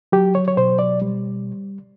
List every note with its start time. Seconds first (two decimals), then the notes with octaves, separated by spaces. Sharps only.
0.12 F#3 G4
0.35 C#5
0.48 C#5
0.57 B2 C5
0.79 D5
1.02 G3